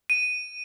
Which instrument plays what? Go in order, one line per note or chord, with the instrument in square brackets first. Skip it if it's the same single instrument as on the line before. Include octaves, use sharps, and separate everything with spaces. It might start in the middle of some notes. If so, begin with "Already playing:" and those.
[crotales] D#7